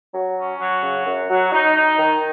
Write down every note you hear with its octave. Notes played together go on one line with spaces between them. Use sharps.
F#3
C#4
F#3
C#3
F#2
F#3
D#4
D#4
D#3